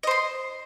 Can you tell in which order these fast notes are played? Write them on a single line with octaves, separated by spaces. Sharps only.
D#5 C5 C6